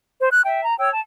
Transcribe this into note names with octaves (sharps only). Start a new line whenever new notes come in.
C5
F#6
E5 G5
A#5
C#5 G5 E6
A5